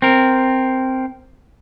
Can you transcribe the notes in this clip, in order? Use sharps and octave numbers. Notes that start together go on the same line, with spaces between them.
C4 A#4